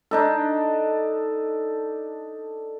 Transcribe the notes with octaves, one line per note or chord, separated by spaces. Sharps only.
D4 D#4 A4